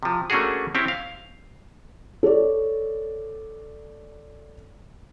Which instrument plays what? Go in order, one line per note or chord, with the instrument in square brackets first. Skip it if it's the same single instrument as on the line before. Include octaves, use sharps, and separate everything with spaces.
[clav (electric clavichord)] C3 F3
A3 A#3 C#4 D4 F#4 G#4
C4 C#4 E4 G4
F5
[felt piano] A4 C#5 D5